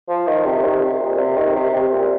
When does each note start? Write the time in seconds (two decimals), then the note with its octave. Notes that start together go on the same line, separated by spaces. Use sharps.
0.09 F3
0.27 D#3
0.46 C3
0.64 D#3
0.83 C3
1.01 A#2
1.19 C3
1.37 D#3
1.56 C3
1.74 C3
1.93 A#2